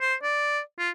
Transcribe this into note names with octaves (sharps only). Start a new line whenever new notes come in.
C5
D5
F4